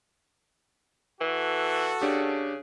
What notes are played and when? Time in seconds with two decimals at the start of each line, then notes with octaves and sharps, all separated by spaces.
1.21 E3 F#4 A4
2.02 C#3 D4 G4